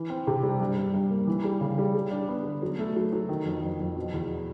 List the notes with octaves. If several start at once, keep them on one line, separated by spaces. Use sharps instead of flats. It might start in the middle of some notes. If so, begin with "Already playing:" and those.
Already playing: E3
C4
C3
G3
G2
G2
G2
A#3
E3
G3
C#3
G3
G3
D4
B3
D3
F#3
A3
F#3
F#3
D#3
F2
F2
F2
B2
E2